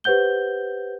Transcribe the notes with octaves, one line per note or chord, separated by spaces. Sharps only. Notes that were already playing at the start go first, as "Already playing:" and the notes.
G4 B4 C5 F#5 G6 G7